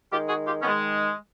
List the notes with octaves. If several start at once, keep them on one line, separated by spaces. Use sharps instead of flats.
D#3 G#3 F4 G4
F#4 G#4
F4 G4
D#3 G#3 B3 C#4